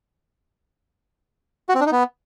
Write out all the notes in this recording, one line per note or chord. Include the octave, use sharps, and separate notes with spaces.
F#4
C4
D4
D#4
B3